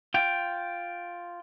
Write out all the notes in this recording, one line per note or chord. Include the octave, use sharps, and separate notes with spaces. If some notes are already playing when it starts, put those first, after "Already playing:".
F4 G5